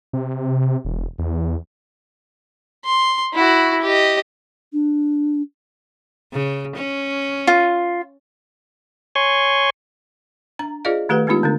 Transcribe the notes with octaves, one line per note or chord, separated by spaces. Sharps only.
C3
E1
E2
C6
E4 F#4
G4 D#5
D4
C#3
C#4
F4
C#5 G#5 C6 C#6
D4 A#5
F4 G#4 C5 D5 D#5 F5
D#3 A3 G4 A4 B4 F#5
G#3 B3 D4 D#4 F4 G4
D3 A3 D4